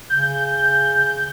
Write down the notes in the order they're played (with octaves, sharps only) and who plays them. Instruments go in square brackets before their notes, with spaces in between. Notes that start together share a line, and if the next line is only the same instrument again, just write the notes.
[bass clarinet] C#3 [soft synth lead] G6